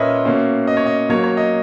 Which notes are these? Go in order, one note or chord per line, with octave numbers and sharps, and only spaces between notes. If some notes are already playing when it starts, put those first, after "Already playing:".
Already playing: A#2 A#3 C#4 A#4 B4 C#5 D#5 E5
B2 A#3 C#4
D#5
C#5
D#5
B2 F#3 A#3 C#5
C#5
D#5